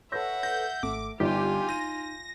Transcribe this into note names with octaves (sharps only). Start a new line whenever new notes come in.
A4 B4 C#5 E5 F#5 E6 G6 A#6
G6 A#6
G#1 A3 D6
G1 D4 D#4 F4 G4 G#5
G6 A#6 D#7